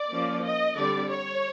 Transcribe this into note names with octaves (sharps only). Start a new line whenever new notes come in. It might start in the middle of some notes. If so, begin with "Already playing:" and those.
Already playing: D5
F3 A#3 C#4
D#5
D3 G3 C4 D5
C#5